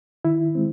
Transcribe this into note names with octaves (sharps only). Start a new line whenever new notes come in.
D#3 E4
G#3 C4